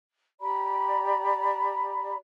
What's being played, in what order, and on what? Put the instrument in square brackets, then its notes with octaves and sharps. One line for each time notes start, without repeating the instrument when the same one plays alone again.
[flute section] G4 D5 A#5 B5